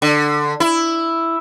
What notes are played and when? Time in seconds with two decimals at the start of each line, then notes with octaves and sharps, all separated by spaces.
0.02 D3
0.60 E4